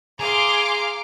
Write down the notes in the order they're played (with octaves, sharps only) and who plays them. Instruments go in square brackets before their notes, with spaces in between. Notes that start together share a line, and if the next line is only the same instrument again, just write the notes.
[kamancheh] G#4 C6 [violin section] F5 D6 [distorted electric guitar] A#5